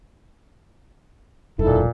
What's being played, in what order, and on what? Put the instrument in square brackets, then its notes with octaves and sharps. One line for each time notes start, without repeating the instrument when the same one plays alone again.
[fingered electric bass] E1 F#2 [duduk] A#2 [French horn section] D#4 E4 A4